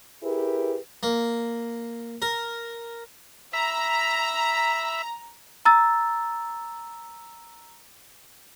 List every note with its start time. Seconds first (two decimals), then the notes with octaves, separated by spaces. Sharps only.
0.23 E4 G4 G#4 A#4 B4
1.03 A#3
2.22 A#4
3.53 E5 A#5 B5
5.65 A#5 E6 A6